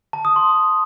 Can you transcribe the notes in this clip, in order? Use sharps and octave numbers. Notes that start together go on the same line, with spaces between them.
A5
D#6
C6